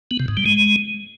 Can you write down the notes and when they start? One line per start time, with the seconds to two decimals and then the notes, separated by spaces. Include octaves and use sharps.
0.11 B3
0.20 C3
0.28 G#2
0.37 G3
0.46 G#3